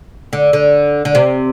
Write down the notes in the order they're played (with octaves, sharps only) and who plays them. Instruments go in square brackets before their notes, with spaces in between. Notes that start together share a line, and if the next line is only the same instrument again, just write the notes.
[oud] D3
D3
D3
C3